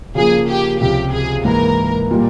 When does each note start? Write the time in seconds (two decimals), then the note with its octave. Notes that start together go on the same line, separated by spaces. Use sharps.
0.15 C#3 F3 A#3 G#4
0.48 G4
0.80 C#2 C3 F3 G4
1.12 G#4
1.44 G#2 E3 A#3 A#4
2.11 A#2 G3 A#3